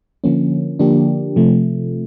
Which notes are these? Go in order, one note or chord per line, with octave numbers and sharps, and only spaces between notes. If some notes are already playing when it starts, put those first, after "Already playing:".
D3 F3 A#3 C#4
D3 F3 A#3 D4 G4
C3 F3 A3